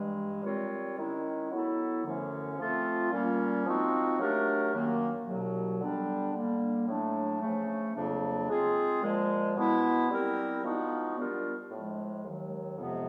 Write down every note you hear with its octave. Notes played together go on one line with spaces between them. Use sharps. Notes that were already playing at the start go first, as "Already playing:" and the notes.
Already playing: G2 E3 G#3
G3 C4 F4 A#4 C#5
D#3 G#3 C#4 E4
F#3 B3 E4 A4
F#2 D3 F3 A3 C#4
F3 A3 C4 F4 A4
A#2 G3 A#3 C#4
F3 G#3 C4 D#4 F#4
F#3 A3 D4 G4 A#4
F#2 D#3 F#3 A#3
C2 B2 F#3
D3 G3 B3 D4 G4
D3 G3 A#3
A2 F#3 A3 D4
C#3 F3 A3
F2 C#3 F#3 A#3 D4
G#3 C4 F4 G#4
A#2 F3 G#3
B2 G#3 B3 E4
G3 C4 E4 G4 A#4
F3 G#3 B3 D#4 F#4
G3 B3 D4 F4 A#4
A2 F3 G#3
D#2 D#3 F#3
F2 C3 F3 G#3 B3